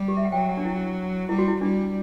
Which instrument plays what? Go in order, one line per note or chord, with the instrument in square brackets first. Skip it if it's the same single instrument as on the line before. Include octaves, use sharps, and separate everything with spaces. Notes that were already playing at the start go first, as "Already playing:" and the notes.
Already playing: [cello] G3
[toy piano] G4
E5
F#5
[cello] F#3 [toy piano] G5
[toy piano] F#5
D4
E4
[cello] G3 [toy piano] E4
[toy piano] F#4
E4
[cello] G3 [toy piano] D4